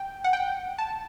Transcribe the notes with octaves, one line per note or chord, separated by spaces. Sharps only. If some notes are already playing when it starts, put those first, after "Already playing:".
Already playing: G5
F#5
G5
A5